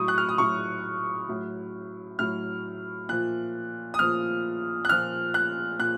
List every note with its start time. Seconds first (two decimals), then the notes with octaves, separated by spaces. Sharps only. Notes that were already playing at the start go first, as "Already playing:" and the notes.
Already playing: A2 F#3 C#6 D#6
0.08 F#6
0.18 F6
0.29 D#6
0.38 A2 F#3 C#6
1.28 A2 F#3
2.19 A2 F#3 F6
3.09 A#2 F3 F#6
3.94 D#6
3.99 A#2 F3 F6
4.85 F#6
4.89 A#2 F3 F6
5.34 F#6
5.79 A#2 F#6